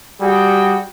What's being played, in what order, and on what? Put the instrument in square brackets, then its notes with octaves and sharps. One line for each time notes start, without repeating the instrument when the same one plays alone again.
[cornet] G3 [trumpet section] F#4 G#4 G5